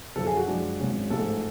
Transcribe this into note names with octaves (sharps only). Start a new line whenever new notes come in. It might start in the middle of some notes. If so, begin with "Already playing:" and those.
F#2 D3 F3 A4
G#4
F#4
F#2 F3 G#3 D4
G#1 G#2 F#3 C#4
A1 G#2 F3 G#3 A4